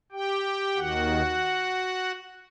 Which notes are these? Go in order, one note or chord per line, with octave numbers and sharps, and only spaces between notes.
G4 G5
D#2 D#3 F#4 F#5